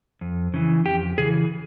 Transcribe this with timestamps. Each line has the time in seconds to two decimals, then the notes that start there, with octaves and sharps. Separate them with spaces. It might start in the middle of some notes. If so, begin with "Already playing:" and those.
0.21 F2
0.54 C#3 E3
0.86 F2 G4
1.18 C#3 E3 G#4